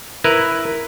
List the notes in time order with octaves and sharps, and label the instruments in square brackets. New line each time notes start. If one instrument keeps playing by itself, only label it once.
[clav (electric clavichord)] E4 A#4 B4